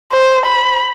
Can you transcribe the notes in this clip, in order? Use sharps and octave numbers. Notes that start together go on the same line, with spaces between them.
C5
B5